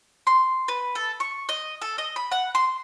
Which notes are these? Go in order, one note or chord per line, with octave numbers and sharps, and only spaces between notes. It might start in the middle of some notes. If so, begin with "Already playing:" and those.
C6
B4
A4
C#6
D#5
A4
D#5
B5
F#5
C6